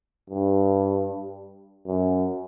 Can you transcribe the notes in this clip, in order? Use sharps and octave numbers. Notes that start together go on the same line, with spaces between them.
G2
F#2